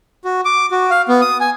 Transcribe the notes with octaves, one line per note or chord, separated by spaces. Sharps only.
F#4
D6
F#4
F5
B3
D#6
G#5